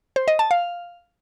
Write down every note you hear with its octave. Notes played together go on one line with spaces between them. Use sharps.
C5
D#5
A5
F5